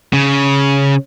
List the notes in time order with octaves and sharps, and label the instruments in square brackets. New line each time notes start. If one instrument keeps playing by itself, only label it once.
[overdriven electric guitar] C#3